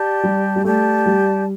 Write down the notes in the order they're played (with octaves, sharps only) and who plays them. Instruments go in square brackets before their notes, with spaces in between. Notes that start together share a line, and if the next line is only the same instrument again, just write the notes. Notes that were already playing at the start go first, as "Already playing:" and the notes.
Already playing: [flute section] G4 D5 A5
[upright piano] G3
G3
[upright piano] A3 [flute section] G4 D5 A5
[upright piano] G3